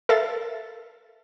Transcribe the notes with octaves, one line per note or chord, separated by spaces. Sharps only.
A4 A#4 E5 F5 A6